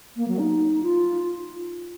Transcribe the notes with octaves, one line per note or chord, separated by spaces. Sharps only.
A#3
F#3
D#4
F4